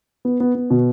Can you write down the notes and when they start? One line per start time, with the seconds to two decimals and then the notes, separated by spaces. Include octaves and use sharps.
0.25 B3
0.40 B3
0.55 B3
0.70 B2